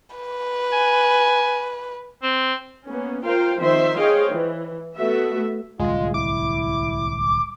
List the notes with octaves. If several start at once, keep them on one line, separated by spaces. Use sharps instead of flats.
B4
G#5
C4
A#3 B3 C#4
F4 A#4 C5 F5 G5
D#3 F3 C4 C5 E5 C6
G#4 C5 C#5 D#5 F5 G5
E3
A3 B3 F#4 E5
D1 C2 G#3 F4
E4 D6